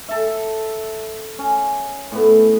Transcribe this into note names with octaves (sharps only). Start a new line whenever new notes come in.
A4 E5
C#4
A2 B3